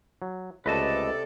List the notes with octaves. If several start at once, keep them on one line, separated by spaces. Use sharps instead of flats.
F#3
C#2 C3 A3 A4 B4 D5 D#5 A5